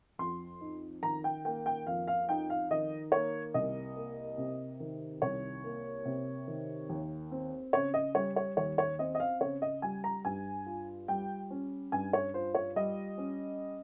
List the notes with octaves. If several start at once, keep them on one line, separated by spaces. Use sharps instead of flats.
F2 C6
D#4
D#3 A#5
G5
A#3 G5
G5
F2 F5
F5
D#4 G5
F5
D#3 D#5
A#3 C#5
C2 D#5
A#3
C3
D#3
C2 C#5
A#3
C3
D#3
D#2
C4
C#3 C#5
D#5
G3 C#5
C#5
D#2 C#5
C#5
C4 D#5
D#5
F5
C#3 C#5
D#5
G3 G#5
A#5
G2 G#5
F4
G3 G5
C#4
G2 G#5
C#5
F4 C5
C#5
G3 D#5
C#4